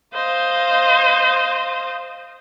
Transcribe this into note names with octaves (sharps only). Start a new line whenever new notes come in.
C5 D#5 F5